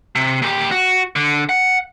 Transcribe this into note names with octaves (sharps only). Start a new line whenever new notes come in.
C3
A#2 G4
F#4
D3
F#5